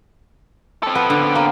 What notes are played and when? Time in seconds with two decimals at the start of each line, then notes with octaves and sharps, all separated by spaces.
0.83 C4 A4
0.95 B3
1.10 D3
1.35 A#3